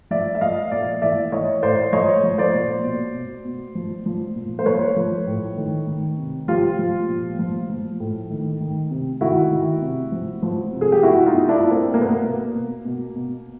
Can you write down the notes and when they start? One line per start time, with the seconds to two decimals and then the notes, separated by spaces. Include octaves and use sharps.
0.11 F3 D5 E5
0.35 E5
0.41 F3 D#5 F5
0.71 A#2 D5 E5
1.02 E3 D5 E5
1.32 E3 C#5 D#5
1.63 A2 C5 D5
1.93 F3 C#5 D#5
2.23 F3
2.38 C5 D5
2.53 A#2
2.84 B2
3.14 B2
3.45 B2
3.75 F3
4.06 F3
4.36 A#2
4.59 C5
4.66 F3 B4 C#5
4.96 F3
5.27 A2
5.57 D#3
5.87 D#3
6.18 C3
6.48 F3 F4 G4
6.79 F3
7.08 A#2
7.39 F3
7.70 F3
8.00 A2
8.30 D#3
8.61 D#3
8.91 C3
9.21 D#3 E4 F#4
9.51 D#3
9.81 C3
10.12 F3
10.43 F3
10.73 C3
10.81 G#4
10.92 G4
11.03 B2 E4 F#4
11.26 D#4 F4
11.33 B2
11.49 D4 E4
11.63 B2
11.71 A#3 C4
11.94 B2 A#3
12.01 B3
12.08 A#3
12.24 B2
12.55 B2
12.85 B2
13.16 B2